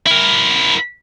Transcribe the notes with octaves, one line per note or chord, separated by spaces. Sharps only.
E4 A#4